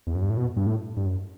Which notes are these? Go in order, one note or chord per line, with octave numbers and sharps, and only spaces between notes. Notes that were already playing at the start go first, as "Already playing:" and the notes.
E2
F#2
G2
A2
B2
G2
A2
G2
F#2